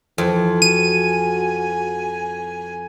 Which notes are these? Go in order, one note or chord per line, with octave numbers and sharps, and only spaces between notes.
F2 E3
F#4 G#5 D#7